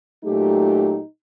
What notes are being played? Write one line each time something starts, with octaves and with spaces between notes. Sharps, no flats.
A#2 F#3 A3 D#4 G4